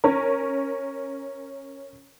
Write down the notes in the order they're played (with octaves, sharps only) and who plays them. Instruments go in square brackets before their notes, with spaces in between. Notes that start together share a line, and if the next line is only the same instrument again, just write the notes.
[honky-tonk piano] C#4 A#4